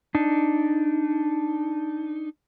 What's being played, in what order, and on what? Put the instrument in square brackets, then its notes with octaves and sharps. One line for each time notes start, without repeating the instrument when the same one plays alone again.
[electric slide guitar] D4 D#4